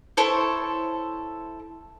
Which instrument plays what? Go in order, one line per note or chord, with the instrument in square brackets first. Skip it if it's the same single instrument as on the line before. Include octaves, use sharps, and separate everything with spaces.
[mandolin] E4 A4 C5 C#5